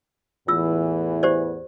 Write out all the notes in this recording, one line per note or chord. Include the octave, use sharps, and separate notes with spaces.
E2 A2 E3 F4 E6
G4 C5 D5